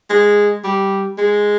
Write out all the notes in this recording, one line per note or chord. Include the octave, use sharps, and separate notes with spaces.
G#3
G3
G#3